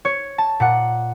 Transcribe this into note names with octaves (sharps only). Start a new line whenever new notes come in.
C#5
A5
A#2 F#5